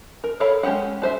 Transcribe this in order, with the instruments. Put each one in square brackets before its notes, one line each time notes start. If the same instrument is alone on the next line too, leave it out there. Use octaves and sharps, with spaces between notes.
[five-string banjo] A#4
A4 A#4 C#5 F5 B5
G#3 C#4 G4 G#4 F#5
D4 C5 E5